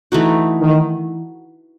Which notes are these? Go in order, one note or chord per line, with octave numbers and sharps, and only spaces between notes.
E3 A3 D#4 F#4
D#3